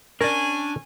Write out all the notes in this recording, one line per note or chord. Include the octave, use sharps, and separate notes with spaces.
C#4 D4 A#4 D5 G#5